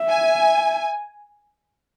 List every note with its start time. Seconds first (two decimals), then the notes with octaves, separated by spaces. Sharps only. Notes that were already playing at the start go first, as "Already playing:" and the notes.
Already playing: E5
0.08 G#5